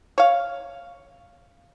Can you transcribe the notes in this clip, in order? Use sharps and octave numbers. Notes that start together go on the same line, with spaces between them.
C#5 F5